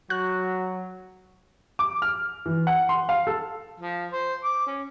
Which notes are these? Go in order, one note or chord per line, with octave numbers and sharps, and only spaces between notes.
F#3 F#4 F#6
D6
F6
E3
F#5
C6
F5
A4
F3
C5
D6
C#4